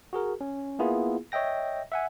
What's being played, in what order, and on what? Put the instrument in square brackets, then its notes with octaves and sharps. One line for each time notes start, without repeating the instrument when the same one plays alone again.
[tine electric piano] F#4 G#4 A#4
C#4
A#3 B3 E4 F4 G#4
C#5 D#5 E5 G5 A#6
E5 F#5 G#5